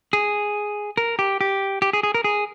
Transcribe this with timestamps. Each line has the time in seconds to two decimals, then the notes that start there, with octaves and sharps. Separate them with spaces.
0.13 G#4
0.97 A#4
1.19 G4
1.41 G4
1.82 G4
1.93 G#4
2.03 G#4
2.14 A#4
2.24 G#4